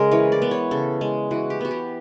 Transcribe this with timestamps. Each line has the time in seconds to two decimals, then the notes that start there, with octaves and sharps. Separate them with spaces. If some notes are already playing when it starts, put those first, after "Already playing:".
Already playing: C#3 G#3 A#4
0.11 E3 C#5
0.32 D5
0.42 B3
0.51 C#5
0.71 C#3 A4
1.01 G#3
1.31 E3 F#4
1.50 G4
1.61 B3 F#4
1.71 G4